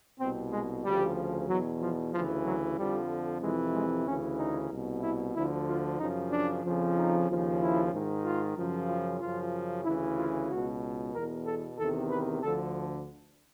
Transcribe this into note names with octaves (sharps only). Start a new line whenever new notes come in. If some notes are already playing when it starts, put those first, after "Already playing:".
C2 B2 C4
G#3
D2 C#3 F3 G3
E2 B2 F#3
F3
D2 C#3 E3 F3
F#3
F2 D3 F3 G3
F2 C3 E3 G#3
G#3
D2 C#3 E3 C#4
D#4
C2 B2
E4
D2 D3 F3 E4
F4
F#2 C#3 F3 D#4
D4
F2 C#3 F3
D#4
D#2 C#3 F3
E4
G#2 D#3
F4
F#2 C#3 F3
F4
F#2 C#3 F3 F4
D2 C#3 E3 E4
F4
C#2 B2 F#4
E2 B2 A#4
A4
E2 C3 D#3 A4
B4
D2 D3 F3 A4